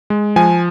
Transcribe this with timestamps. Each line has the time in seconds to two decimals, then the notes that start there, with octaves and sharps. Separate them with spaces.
0.10 G#3
0.36 F3 G#5